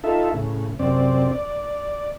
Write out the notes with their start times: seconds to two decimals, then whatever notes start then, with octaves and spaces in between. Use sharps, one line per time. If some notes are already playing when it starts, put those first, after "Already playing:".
0.04 D#4 F4 A4 E5
0.34 A2 C#3
0.79 F#2 C3 C4 D5
1.32 D5